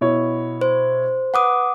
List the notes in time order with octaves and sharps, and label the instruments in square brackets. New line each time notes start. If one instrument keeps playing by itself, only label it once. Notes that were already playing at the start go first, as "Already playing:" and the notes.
[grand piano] B2 E4 C#5
[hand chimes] C5
[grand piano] B4 [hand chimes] F#5 D6 D#6